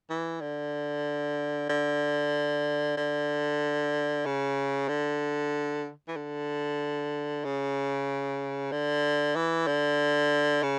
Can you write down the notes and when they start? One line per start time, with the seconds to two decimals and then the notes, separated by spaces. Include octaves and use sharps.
0.10 E3
0.41 D3
1.69 D3
2.97 D3
4.26 C#3
4.88 D3
6.08 E3
6.16 D3
7.45 C#3
8.72 D3
9.36 E3
9.67 D3
10.63 C#3